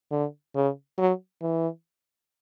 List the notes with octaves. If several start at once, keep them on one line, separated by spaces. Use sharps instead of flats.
D3
C#3
F#3
E3